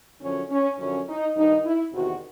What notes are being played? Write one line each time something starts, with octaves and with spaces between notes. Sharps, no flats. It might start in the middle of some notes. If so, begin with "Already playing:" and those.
F#2 D3 F3 C#4
C#4
F#2 D3 F3 C#4
D#4
G2 D#3 D#4
E4
E2 C3 D#3 F#4